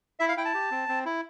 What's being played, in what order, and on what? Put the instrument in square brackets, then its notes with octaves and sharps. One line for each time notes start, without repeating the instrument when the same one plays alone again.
[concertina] E4 E5
F5
E4 G5
A5
G4
C4
C4
E4